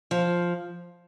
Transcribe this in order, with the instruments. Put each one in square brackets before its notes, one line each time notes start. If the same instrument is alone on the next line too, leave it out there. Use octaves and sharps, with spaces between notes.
[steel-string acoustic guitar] F3